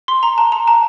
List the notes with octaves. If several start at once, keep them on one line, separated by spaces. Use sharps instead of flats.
C6
A#5
A5
A#5
A5